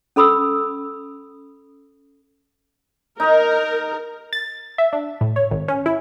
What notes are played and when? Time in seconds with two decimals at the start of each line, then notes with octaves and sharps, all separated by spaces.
0.16 C#4 A4 B5 D#6 E6
3.20 D#4 A#4 D#5
4.33 A6
4.78 E5
4.93 D4
5.21 A2
5.36 C#5
5.51 G#1
5.68 C#4
5.86 E4